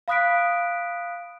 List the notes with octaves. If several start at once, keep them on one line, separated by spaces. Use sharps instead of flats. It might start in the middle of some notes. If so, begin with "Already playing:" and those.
F5 B5 D#6 F#6 B6 D7